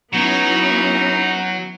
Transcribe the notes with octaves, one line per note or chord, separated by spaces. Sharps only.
F#3 B3 C#4 D#4 E4 C#5